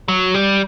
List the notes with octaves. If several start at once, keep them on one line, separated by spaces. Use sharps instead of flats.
F#3
G3